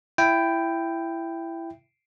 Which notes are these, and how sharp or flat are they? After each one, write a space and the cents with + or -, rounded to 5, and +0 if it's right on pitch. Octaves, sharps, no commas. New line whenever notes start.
E4 +15 G5 +0